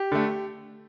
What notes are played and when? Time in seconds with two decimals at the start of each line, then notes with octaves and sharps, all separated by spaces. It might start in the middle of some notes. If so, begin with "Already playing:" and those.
Already playing: G4
0.12 D3 A3